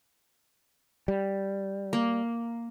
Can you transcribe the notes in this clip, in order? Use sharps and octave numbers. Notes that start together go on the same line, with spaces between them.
G3
A#3